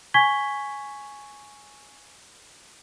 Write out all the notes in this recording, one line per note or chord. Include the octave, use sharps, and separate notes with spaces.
G#5 C#6 G#6 B6 G7